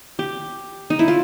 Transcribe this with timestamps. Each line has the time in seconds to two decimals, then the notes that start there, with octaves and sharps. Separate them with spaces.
0.19 G4
0.90 D#4
0.99 E4
1.08 F4